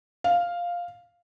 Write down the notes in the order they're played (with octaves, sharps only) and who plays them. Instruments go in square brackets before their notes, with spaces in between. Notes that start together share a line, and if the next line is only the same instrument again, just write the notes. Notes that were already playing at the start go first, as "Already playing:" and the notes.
[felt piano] F5